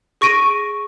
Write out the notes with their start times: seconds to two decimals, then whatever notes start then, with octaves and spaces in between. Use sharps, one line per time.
0.21 G#4 C#6 A#6 D7 D#7